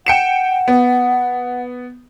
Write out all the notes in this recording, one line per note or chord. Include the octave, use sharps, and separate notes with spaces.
F#5 G5 C#7 E7
B3